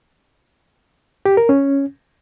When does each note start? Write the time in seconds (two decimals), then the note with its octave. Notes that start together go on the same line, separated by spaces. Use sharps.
1.25 G4
1.37 A#4
1.49 C#4